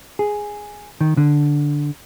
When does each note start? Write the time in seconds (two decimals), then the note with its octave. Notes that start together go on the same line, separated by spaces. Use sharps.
0.19 G#4
1.01 D#3
1.17 D3